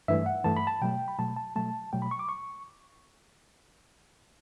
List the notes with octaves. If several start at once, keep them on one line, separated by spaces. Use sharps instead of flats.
G2 E3 A3 E5
F#5
G2 E3 A3 A5
B5
A5
B2 F#3 A3 G5
B5
B2 F#3 A3 A5
A5
B2 F#3 A3 A5
B2 F#3 A3 G5
B5
C#6
D6
C#6